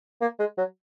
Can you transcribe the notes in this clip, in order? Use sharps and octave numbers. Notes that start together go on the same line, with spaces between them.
A#3
G#3
F#3